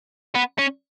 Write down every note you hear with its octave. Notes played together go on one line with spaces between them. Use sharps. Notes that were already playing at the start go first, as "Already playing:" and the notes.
B3
C#4